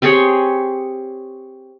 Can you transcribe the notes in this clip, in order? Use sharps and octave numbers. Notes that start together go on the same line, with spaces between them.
C4 G4 G#4 C#5